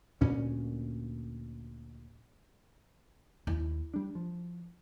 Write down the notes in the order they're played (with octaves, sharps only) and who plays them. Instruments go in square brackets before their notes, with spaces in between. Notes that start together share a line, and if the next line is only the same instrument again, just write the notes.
[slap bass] D2 A#2 C#4
[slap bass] D#2 [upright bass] E4
[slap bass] G3 D4
F3